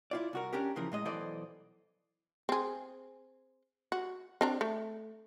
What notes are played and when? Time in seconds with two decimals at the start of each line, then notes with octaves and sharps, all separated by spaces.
0.11 E4 F4 D5
0.33 C2 F#4 A#4
0.53 C#4 D4 G4 A#4
0.76 C#3 E3 F3 A#4
0.92 A2 G#3 D#5
1.05 B1 E3 A4 C5 D5 D#5
2.49 C4 G#4
3.92 F#4
4.41 C4 D4 A#5
4.61 A3